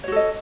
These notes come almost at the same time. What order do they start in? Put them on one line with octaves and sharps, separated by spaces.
C#5 F#4 A4 D#5